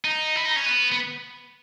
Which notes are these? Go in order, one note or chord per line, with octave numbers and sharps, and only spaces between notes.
D#4
E4
D#4
C#4
B3
B3